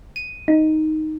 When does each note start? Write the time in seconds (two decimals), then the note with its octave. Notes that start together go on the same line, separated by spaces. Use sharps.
0.16 D#7
0.48 D#4